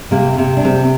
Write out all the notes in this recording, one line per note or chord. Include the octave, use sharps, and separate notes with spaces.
C3 A#3
C3
D4
C3 C4